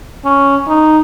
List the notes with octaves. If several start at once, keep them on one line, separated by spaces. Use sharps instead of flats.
C#4
D#4